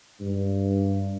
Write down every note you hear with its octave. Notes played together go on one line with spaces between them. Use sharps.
G2